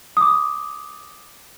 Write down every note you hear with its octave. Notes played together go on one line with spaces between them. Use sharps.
D6 D#6